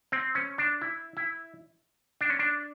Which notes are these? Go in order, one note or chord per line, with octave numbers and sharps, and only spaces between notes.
C4
C#4
D4
E4
E4
D4
C#4
D4